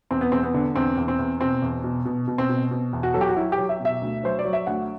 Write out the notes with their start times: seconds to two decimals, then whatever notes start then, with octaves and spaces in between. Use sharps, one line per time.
0.11 E2 C4
0.21 B3
0.32 E2 C4
0.43 B3
0.54 D3
0.75 E2 C4
0.97 E2
1.08 C4
1.19 E2
1.41 B2 C4
1.62 E2
1.84 B2
2.05 B2
2.28 B2
2.38 C4
2.49 B2
2.71 B2
2.93 E2
3.03 F#4
3.14 F#3 A4
3.21 G4
3.29 F#4
3.36 F#3 E4
3.52 G4
3.58 F#3
3.69 E5
3.80 B2
3.85 E5
4.01 D2
4.23 F#3 C5
4.39 D5
4.45 F#3
4.53 E5
4.67 D2 F#5